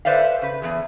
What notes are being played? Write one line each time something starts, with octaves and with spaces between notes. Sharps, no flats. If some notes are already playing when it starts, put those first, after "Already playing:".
A4 B4 C5 D5 E5 F5
C#3 B4
E2 E3 G#4